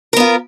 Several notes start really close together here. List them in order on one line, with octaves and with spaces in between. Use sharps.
A#4 B3 F4